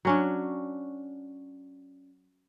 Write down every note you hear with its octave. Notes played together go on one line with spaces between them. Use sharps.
F#3 C#4 D4